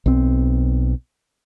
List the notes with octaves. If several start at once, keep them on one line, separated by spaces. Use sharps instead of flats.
B1 C4